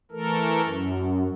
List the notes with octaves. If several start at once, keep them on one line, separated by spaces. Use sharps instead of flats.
E3 A3 A4 A#4
F#2